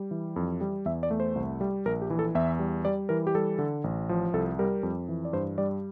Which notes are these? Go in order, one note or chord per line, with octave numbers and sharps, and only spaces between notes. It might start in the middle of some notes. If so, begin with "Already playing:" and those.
Already playing: G3
E3
F2
G3
E2 E5
D5
A3
C5
C2
G3
A#1 A#4
G4
E3
A4
E2 E5
G3
G3 D5
E3 A#4
G4
G3 A4
D3
A1
F3
C2 A4
G3 A#4
F2
E3
D5
G2 C5
G3 D5